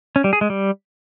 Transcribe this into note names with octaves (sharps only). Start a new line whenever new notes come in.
C#4
G3
G#4
G#3
G3